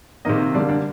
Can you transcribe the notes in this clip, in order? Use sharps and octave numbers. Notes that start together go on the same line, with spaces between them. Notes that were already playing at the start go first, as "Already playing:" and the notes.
C3 D#3 A#3 D#4 D#5
D3 G3 A#3 D4 D5
D4 D5